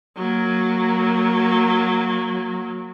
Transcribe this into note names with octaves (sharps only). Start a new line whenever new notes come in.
F#3 A#3